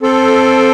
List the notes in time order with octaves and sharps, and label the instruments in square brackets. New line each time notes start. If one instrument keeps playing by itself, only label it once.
[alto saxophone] C4 [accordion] A4